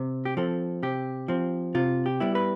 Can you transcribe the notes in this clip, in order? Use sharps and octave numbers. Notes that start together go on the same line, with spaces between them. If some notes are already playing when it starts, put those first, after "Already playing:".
Already playing: C3
G4
F3 C4 A4
C3 G4
F3 C4
C3 F4
G4
G3 B3 E4
B4